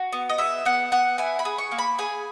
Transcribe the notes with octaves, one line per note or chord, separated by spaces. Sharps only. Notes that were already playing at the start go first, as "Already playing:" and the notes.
Already playing: F#4
B3
D#5
G#4 E5
B3 F#5
B3 F#5
E4 G#5
B5
G#4
C#6
A#3
B5
G#4 G#5